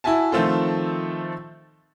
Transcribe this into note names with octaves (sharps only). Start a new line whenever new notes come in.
E4 F#4 E5 G#5 A5
D#3 F3 A3 C4 F4 A4